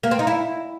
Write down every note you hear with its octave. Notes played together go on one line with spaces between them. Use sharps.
A#3
C4
D#4
E4